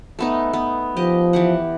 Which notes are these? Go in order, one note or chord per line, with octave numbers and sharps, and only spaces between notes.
A3 B3 D#4
B3
F3 G4 D#5
E3 G4 F#5